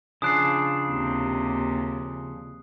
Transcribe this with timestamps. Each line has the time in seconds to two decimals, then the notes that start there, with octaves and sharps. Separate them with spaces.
0.22 C#3 F3 D4 D#6 F#6 C7
0.89 D#2 C3